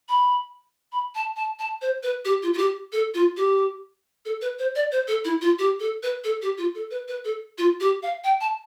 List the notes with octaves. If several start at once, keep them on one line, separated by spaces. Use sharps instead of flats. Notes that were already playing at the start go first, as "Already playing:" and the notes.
B5
B5
A5
A5
A5
C5
B4
G4
F4
F4
G4
A4
F4
G4
A4
B4
C5
D5
C5
A4
E4
F4
G4
A4
B4
A4
G4
F4
A4
B4
B4
A4
F4
G4
F5
G5
A5